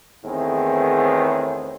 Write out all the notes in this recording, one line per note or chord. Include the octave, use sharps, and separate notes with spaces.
E2 A2 D#3 B3 C4 G#4